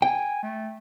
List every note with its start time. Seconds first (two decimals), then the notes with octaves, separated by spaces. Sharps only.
0.02 G5 G#5
0.43 A3